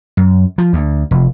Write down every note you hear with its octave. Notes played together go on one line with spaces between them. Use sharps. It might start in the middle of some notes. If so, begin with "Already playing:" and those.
F#2
F3
D2
F1